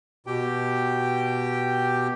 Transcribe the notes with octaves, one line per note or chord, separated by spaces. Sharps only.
B2 G4 G5